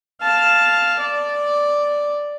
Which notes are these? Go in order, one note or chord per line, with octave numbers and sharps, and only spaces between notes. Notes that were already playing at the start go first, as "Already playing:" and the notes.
F5 A5
D5